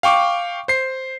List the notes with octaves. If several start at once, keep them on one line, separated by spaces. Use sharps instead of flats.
F5 G5 C#6 D6
C5 C7